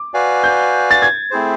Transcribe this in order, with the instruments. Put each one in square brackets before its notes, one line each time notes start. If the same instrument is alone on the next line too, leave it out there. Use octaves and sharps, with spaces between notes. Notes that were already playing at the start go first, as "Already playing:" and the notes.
Already playing: [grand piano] D6
[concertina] F#4 B4 D5 F5 G#5
[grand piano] G6
A6
G#6
[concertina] A3 C4 E4 G#4 C5